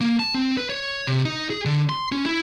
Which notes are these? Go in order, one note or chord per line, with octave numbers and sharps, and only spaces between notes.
A#3
A5
C4
B4
C#5
C3
D#4
G#4
D3
C6
C#4
E4